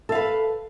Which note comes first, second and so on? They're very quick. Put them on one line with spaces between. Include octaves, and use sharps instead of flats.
A4 F5 B4